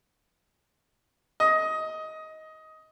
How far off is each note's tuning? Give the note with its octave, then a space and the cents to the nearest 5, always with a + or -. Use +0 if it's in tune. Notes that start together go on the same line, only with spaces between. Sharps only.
D#5 +15